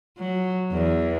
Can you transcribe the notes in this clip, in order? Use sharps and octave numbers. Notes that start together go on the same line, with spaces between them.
F#3
E2